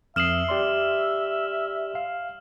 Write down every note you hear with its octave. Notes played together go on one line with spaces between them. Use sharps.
F2 E5 D#6 F6 C7 E7 F#7
G4 D5 C6
F5